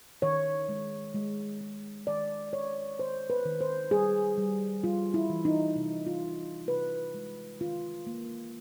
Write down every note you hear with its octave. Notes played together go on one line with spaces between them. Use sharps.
D#3 C#5
G#3
G#3
G#3
D#3 D5
D#3 C#5
D#3 C5
B4
D#3
C5
G3 G#4
G3
G3 F4
E4
E3
D#4
C3
F4
C3
C3 B4
G#3
D#3 F4
A#3